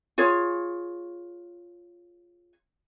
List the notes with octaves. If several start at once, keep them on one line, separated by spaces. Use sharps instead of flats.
F4 G#4 C#5